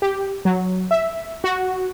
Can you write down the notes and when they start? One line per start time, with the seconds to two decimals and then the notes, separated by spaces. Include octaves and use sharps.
0.02 G4
0.45 F#3
0.91 E5
1.44 F#4